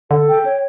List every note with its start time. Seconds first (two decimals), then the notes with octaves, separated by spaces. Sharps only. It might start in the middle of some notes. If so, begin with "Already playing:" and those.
0.11 D3 A4
0.28 G5
0.45 C#5